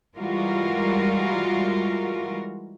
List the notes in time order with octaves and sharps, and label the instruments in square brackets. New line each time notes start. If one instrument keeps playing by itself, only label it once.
[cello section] E3 G3 G#3 F4 F#4 A#4